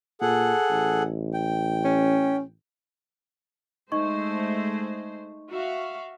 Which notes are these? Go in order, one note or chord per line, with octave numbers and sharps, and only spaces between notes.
A#2 G#4 A4 F#5
A1
G5
C#4
G#3 A3 D#4 C5 D#5 C#6
F#4 E5 F5